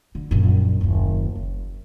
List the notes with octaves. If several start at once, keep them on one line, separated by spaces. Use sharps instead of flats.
D3
A#1 F#2
F#1 D#2
F#1